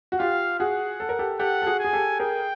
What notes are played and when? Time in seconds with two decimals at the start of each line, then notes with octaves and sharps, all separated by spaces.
0.12 F#4
0.19 F4 G4 F5
0.60 F#4 G#4 F#5
1.00 A4
1.09 A#4
1.19 G4 A4
1.40 G4 A4 F#5
1.62 A4
1.67 F#4 G#4
1.80 G#4 G#5
1.93 G4 A4
2.20 G#4 A#4 G5